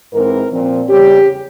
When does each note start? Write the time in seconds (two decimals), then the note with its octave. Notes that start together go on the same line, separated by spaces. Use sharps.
0.13 G#2 E3 G#3 C4 A#4
0.51 A#2 F3 C4
0.89 E2 C#3 G3 C#4 G4